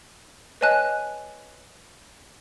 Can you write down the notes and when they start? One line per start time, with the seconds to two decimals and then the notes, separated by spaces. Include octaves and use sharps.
0.61 B4 C#5 D#5 G#5 A5 F#6